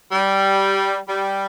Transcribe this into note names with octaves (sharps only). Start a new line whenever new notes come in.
G3
G3